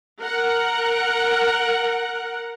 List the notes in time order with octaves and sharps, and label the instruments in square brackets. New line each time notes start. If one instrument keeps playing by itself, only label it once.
[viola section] A#4 F#5